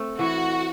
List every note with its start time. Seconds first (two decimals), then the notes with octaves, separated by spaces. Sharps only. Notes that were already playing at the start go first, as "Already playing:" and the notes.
Already playing: A3 C4
0.19 E3 F#4